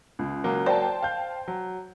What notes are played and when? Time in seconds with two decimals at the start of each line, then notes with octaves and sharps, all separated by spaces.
0.19 C#2
0.44 F#3 A#3
0.66 C5 D5 G5 A5
1.02 F5 G6
1.48 F#3